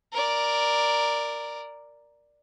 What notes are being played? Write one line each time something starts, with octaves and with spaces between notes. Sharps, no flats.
A#4 D5